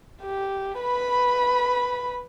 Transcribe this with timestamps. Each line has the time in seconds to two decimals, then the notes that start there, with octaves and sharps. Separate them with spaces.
0.22 G4
0.80 B4 B5